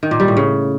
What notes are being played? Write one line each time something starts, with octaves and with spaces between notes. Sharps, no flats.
D#3
A#2
G3
A2
C#3